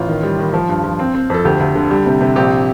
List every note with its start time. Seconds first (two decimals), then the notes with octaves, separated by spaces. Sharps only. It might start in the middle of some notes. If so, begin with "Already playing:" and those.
Already playing: A1 F4
0.08 D#3
0.23 G3
0.38 D#3
0.54 F3
0.69 G2
0.84 F3
0.99 C4
1.14 C4
1.30 F2 A4
1.45 D2 G4
1.60 D2
1.75 D3
1.91 G3
2.06 C3
2.21 C3
2.36 A#1 G4